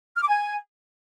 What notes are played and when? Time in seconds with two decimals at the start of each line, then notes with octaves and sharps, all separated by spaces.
0.16 F6
0.22 D6
0.28 G#5